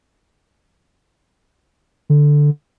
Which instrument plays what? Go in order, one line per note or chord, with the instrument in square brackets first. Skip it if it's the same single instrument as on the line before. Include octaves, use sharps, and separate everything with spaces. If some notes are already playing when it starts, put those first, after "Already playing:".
[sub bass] D3